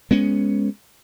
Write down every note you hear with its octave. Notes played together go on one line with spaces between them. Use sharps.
G#3 B3 C#4